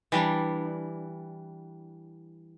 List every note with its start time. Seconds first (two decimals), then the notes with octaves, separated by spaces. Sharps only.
0.12 E3 G3 D4